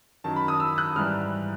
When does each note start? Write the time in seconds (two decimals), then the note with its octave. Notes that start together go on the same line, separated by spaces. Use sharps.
0.24 F#2 D#3 F#3 A5
0.36 B5
0.48 D#6
0.60 E6
0.78 F#6
0.96 G#2 E3 G3 F6